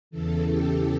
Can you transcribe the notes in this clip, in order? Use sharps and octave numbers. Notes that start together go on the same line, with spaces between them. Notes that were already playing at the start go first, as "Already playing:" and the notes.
E2 C#3 E3 A4
G4